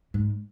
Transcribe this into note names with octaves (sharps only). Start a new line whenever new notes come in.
G#2